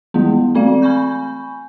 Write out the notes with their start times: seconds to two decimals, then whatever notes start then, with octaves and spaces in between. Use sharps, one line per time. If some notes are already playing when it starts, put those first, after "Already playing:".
0.14 E3 G3 G#3 B3
0.55 A3 C4 D5 F5
0.82 G#5 B5 C#6 G6